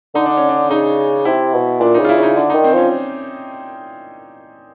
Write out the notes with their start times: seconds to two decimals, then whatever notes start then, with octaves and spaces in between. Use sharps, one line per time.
0.15 D3 D#4
0.26 D4
0.37 C#4
0.49 D4
0.70 C#3 D#4
1.25 C3 E4
1.54 B2
1.81 A#2 D4
1.94 D#4
1.99 C#3
2.04 F4
2.09 E4
2.18 C#3 D#4
2.36 D3 D4
2.50 D#4
2.55 D#3
2.64 C4
2.73 F3 C#4